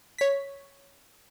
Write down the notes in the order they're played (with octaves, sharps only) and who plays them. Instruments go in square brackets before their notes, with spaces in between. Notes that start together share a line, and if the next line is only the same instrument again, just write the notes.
[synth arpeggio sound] C#5 B6